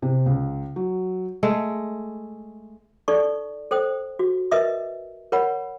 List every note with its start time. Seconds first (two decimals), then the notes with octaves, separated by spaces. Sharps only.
0.02 C3
0.26 C#2
0.76 F#3
1.43 G#3 A3
3.08 D#4 A4 D5 C#6
3.71 A4 C5 G5 D#6
4.19 F#4
4.51 A#4 B4 D#5 E5 D#6
5.32 A#4 C#5 F#5 B5